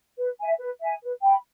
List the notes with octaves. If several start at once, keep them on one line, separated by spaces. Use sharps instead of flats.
B4
E5 G#5
B4
E5 G#5
B4
G5 B5